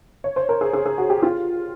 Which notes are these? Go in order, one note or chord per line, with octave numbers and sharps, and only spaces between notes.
C#5
C5
A#4
G#4
G#4
G#4
F#4
G4
F4